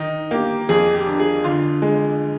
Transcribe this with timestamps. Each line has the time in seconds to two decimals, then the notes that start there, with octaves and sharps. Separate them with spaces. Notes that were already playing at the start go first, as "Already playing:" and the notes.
Already playing: D#3 D#4
0.31 A#3 G4
0.69 F2 G#4
0.94 G4
1.06 D4
1.19 G#4
1.44 D3 F4
1.82 G#3